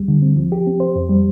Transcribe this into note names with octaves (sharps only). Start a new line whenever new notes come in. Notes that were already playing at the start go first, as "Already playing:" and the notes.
Already playing: D2 G3
D3
C4
F3
G4
C4
C5
F2
G3